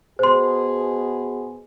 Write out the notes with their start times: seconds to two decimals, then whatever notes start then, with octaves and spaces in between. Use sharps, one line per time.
0.19 B2 G#4 C5 C6